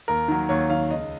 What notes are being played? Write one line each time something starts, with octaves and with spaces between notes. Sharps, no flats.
D#2 A#4
D#3 F#3
D#2 C#5
D#3 F#3 F5
C#2 D#5